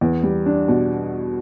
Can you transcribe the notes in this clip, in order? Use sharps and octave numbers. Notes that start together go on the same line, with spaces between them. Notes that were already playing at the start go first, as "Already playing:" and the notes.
E2
G3
D4
B2